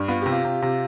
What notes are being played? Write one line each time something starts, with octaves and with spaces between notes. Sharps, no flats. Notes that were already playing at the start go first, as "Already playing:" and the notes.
Already playing: G2
B3 F4
C3 G4
F4
C3
C3